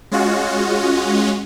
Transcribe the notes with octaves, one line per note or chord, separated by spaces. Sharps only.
G#3 C#4 F4 F#4